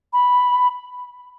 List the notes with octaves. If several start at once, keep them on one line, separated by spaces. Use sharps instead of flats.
B5